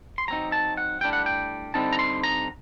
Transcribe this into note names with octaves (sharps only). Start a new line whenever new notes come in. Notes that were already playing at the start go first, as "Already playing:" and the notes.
C6
F#3 C4 D#4 A#5
A5
F#5
A2 G3 D4 G5
F#5
G5
D3 G3 C4 D#4 A5
A#5
C6
A#5